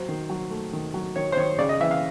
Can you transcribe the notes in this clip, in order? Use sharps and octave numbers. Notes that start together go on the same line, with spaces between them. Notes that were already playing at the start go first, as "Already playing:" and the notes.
Already playing: F#3 C5
D#3
F#3
A3
D#3
F#3
D#3 C#5
C5
D#3 C#5
C#3 D5
D#5
E3 E5
F5